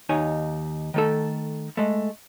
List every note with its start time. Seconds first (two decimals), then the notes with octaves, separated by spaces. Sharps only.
0.09 D#2 D#4 C#5 G#5
0.94 D#3 A3 A4
1.77 G#3 A3